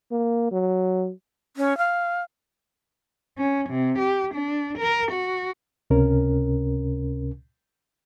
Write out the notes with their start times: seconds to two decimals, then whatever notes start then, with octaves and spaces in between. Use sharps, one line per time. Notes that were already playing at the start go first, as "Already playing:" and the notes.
0.12 A#3
0.52 F#3
1.57 C#4
1.78 F5
3.38 C#4
3.70 C3
3.99 G4
4.34 D4
4.78 A#4
5.12 F#4
5.90 C#2 C3 C#4 A#4